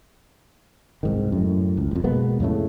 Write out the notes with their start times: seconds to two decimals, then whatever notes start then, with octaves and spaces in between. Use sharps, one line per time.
1.03 C2 G#2 D#3
1.32 F#2 A2
1.77 C#2
1.91 A1 F2
2.04 B2 G#3 A#3 B3
2.40 F2 A2 C#3 A3